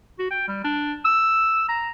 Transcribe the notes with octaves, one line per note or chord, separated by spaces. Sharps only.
F#4
G5
G3
D4
E6
A#5